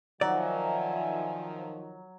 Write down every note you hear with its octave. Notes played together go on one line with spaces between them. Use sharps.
D#3 F3 F#3 D5 E5 G#5